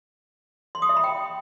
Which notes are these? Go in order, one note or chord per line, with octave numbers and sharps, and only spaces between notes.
C6
D#6
E5
B5
G5